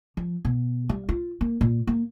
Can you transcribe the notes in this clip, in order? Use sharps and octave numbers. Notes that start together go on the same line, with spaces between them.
F3
B2
G3
F4
A#3
A#2
A#3